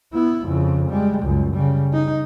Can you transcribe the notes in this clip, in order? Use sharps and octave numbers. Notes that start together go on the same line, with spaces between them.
B3 E4
F2 C#3
G3 G#3
C#2 F#2
C#3 G3
D#4